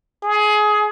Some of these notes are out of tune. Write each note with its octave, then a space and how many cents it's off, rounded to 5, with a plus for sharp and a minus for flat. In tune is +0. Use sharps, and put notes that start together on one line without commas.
G#4 +20